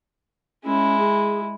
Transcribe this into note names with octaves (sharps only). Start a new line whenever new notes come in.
G#3 C#4 E4
G#4